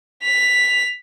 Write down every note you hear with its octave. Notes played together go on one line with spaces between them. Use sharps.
B6 F7